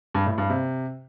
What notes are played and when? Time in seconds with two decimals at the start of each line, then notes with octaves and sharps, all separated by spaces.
0.15 G2
0.26 A2
0.38 G2
0.50 C3